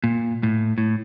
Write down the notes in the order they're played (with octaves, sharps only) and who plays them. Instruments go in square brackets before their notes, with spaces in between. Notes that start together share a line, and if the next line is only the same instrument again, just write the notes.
[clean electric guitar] A#2
A2
A2